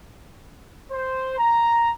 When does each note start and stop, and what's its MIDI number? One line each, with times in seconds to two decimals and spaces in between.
0.92 1.38 72
1.39 1.91 82